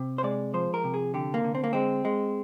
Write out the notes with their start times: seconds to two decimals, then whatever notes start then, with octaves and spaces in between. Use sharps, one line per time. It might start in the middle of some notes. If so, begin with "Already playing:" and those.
Already playing: C3
0.18 C5
0.23 G#3 D5
0.54 F3 C5
0.74 A#4
0.84 C3
0.94 G#4
1.14 D3 G4
1.34 A#3
1.44 D3
1.55 C4
1.64 A#3
1.73 G#3 C4
2.05 G#3